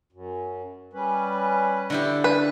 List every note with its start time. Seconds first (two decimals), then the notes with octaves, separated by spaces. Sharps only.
0.13 F#2
0.93 G3 C#4 B4
1.90 D3 E4 G4 D5
2.24 B4